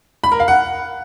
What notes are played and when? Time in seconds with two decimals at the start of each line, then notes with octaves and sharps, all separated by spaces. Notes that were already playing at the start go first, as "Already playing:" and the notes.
0.24 B5
0.32 A#4
0.40 F5
0.48 F#5